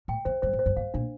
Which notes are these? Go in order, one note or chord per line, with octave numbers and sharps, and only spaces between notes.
A2 G5
F2 C5
G2 C5
A2
C5
G2
G2 F5
A#2 D4